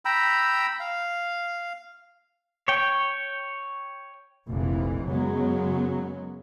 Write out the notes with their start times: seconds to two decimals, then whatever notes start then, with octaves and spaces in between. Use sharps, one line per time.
0.05 G5 A#5 B5 E6
0.80 F5
2.68 C#5 G5
4.47 F1 A#1 F2 E3
5.04 F#2 C#3 F#3 G#3 B3